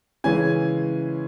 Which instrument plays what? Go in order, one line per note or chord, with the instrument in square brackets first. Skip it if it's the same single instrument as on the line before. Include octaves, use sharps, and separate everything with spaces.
[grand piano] C#3 E3 G#3 C#4 G#5 G#6